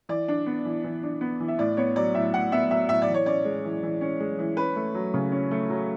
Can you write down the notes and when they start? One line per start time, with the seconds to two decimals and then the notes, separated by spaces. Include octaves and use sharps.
0.09 E3 D5
0.28 D4
0.46 B3
0.65 E3
0.84 E3
1.03 D4
1.21 B3
1.40 E3
1.48 E5
1.58 A2 D5
1.77 B3 C#5
1.96 F#3 D5
2.15 A2 E5
2.34 A2 F#5
2.52 B3 E5
2.70 F#3 E5
2.89 A2 E5
3.02 D5
3.08 E3
3.14 C#5
3.26 C#4 D5
3.45 G#3
3.64 E3
3.83 E3
4.01 C#4
4.20 G#3
4.39 E3
4.57 C#4 B4
4.76 A3
4.95 F#3
5.14 C#3
5.32 C#4
5.51 A3
5.69 F#3